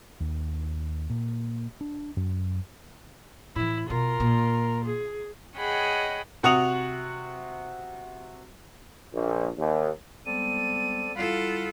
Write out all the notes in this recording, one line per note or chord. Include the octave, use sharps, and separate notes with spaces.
D#2
A#2
D4
F#2
A2 E3 E4
B2 F4 A#4
A#2
G#4
G#4 C#5 D#5 F#5 G5 B5
C3 F#4 F#5 D#6 F7
A#1
D#2
G3 G#3 B3 C4 A4 D5 D#7
G3 E4 F4 A4 F5 F#5 B5